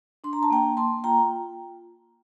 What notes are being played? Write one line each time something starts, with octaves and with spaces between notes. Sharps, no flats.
D4 C6
A#5
A5
A#3 G5 A#5
A#3 A5 C6
F4 G5 A#5